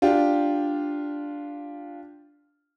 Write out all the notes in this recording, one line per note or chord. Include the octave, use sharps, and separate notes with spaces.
D4 F4 G4